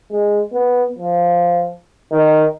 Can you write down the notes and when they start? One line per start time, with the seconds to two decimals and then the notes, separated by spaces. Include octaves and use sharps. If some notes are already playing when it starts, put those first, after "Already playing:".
0.11 G#3
0.53 B3
0.98 F3
2.12 D#3